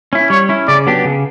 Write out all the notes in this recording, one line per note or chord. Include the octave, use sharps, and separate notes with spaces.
C#4 E4
G3 C#5
C#4 E4
C#3 D5
F#3 B3 D4 G4
C#3